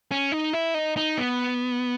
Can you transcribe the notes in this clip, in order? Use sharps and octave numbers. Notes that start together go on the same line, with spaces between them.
C#4
D#4
E4
D#4
D#4
B3